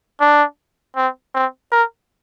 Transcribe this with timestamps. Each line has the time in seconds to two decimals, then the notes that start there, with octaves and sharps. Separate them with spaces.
0.21 D4
0.96 C4
1.35 C4
1.72 A#4